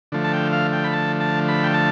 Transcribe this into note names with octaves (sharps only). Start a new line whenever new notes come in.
D3 F3 A3
A5
G5
F5
G5
B5
A5
A5
B5
G5
A5